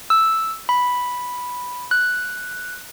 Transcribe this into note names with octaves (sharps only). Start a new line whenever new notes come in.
E6
B5
F#6